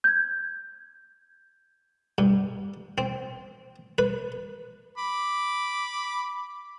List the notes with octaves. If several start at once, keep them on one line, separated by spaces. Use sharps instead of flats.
G6 G#6
G2
C4
B4
B5 D6